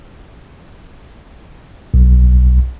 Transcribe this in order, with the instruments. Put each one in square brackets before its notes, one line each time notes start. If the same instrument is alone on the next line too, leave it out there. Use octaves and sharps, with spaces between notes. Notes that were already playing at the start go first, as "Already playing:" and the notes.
[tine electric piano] B1